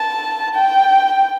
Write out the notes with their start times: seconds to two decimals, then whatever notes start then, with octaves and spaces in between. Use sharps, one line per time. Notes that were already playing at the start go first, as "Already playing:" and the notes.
Already playing: A5
0.55 G5